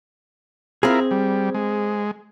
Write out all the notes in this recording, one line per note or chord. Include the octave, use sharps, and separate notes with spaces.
C4 E4 F4 G#4 A#4
G3
G#3